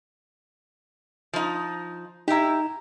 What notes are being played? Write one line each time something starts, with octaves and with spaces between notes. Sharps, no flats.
F3 D#4
D#4 E4 G4 A#5